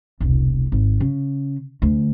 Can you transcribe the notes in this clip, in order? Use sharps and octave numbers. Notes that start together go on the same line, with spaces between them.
E1 C2
G#1
C#3
D2